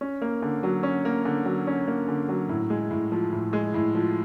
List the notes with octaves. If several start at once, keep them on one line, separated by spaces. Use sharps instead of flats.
C#4
A#3
D3
F#3
C#4
A#3
D3
F#3
C#4
A#3
D3
F#3
A2
G#3
A2
F3
A2
G#3
A2
F3